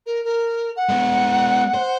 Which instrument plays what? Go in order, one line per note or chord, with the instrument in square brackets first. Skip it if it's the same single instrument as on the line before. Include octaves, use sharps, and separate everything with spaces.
[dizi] A#4
A#4
F#5
[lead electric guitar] G#3 B3
C5